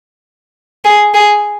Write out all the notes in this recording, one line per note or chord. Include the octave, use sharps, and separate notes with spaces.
G#4
G#4